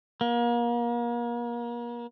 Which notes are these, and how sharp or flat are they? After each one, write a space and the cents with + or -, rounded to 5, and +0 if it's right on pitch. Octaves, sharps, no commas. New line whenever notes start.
A#3 +35